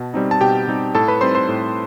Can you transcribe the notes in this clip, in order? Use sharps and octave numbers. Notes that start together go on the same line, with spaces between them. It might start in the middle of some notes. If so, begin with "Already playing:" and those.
Already playing: B2 A5
G3 C4 D#4
A5
B2 G4 G5
G3 C4 D#4
A2 A4 A5
B4 B5
G3 C4 D#4 C5 C6
C5 C6
A2